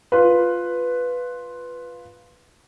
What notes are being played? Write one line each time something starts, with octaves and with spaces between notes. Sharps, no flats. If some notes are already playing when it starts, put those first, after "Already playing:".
F4 B4